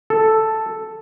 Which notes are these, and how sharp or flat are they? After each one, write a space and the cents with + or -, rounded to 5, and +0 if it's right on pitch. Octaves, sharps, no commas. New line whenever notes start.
A4 +0